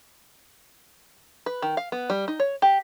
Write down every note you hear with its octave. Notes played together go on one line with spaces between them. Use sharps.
B4
D#3
F5
B3
G3
D#4
C#5
G4